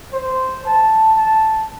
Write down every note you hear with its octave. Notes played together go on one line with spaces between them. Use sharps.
C5
A5
A5